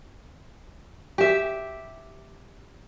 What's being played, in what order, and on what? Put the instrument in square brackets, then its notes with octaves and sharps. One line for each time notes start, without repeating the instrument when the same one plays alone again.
[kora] G4 E5